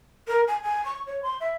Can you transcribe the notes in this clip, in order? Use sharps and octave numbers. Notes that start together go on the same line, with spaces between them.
A#4
G#5
G#5
C#6
C#5
C6
E5